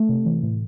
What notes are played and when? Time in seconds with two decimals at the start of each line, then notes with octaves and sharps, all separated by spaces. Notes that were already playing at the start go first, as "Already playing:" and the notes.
Already playing: A3
0.09 C3
0.25 E3
0.43 A2